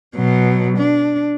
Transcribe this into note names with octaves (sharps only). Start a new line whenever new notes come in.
B2 F#3
D4